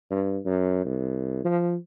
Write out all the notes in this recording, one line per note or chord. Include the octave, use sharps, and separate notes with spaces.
G2
F#2
C2
F3